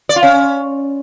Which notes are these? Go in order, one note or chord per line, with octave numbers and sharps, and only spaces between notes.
D5
F4
C#4